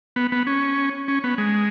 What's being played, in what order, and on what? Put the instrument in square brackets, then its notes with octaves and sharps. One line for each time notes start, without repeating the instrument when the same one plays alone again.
[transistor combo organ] B3
B3
C#4
C#4
B3
G#3